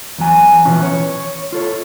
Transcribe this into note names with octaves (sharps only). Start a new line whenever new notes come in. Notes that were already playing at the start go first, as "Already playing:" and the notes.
E2 F#3 G#5
B2 E3 F3 B3 C#4
C#5
F4 A4 C#5